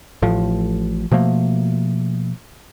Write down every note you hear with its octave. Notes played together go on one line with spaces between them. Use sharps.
A1 A2 F3
B2 F3 A3 A#3